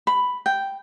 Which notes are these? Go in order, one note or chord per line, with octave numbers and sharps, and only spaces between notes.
B5
G5